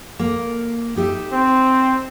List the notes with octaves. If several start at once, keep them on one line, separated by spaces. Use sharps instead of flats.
A#3
D#4 G4 E5
C4